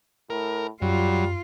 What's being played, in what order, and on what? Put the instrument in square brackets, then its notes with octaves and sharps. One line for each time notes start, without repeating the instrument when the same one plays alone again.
[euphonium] A2 [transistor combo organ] A#4
[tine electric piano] F#2 [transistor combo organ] F#3 [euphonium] G3 [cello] F4